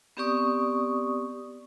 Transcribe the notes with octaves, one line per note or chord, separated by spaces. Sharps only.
B3 C4 G4 D5 C#6 D#6